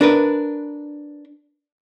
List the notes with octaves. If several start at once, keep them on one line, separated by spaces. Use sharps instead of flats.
D4 A#4 B4